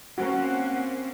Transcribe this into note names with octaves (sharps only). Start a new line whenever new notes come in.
A#3 C4 C#4 F#4 A#4 F#5